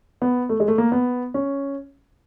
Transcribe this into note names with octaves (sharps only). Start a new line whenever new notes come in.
B3
A3
G#3
A3
A#3
B3
C#4